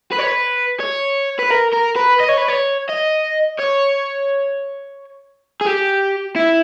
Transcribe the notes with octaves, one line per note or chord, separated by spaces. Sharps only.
B4
C#5
B4
C#5
B4
A#4
A#4
B4
D#5
C#5
B4
C#5
D#5
C#5
G#4
G4
E4